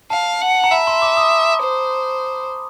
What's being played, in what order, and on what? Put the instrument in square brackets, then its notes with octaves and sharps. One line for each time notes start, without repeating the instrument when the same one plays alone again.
[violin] F5 [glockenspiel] A5
[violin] F#5
[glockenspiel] A#5
[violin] E5 [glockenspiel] B5
[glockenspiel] C6
D6
D#6
[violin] C5